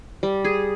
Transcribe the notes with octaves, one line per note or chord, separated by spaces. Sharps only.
G3
G#4